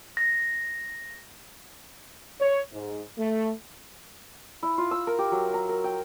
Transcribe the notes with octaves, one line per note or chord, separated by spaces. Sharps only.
A#6
C#5
G#2
A3
E4
F4
E6
A#4
G4
F#3
A#5
A#4
G5